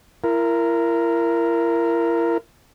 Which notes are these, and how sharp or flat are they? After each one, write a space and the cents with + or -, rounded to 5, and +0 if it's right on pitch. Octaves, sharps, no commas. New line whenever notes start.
E4 +35 A#4 +0